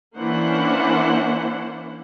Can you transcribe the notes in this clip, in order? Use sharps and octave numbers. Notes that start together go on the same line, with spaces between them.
E3 A#3 C#4 D4 C5 F#5